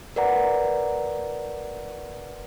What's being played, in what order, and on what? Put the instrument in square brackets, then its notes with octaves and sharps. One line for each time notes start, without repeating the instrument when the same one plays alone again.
[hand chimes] A#4 B4 D5 F#5 A#5